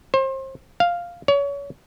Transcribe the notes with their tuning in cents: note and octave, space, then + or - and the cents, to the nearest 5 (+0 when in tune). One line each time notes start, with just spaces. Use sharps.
C5 +30
F5 +0
C#5 +30